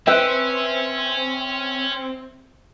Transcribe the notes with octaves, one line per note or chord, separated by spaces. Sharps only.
C4 C#4 B4 C5 E5 G5